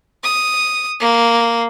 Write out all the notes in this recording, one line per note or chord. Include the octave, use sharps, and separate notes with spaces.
D#6
A#3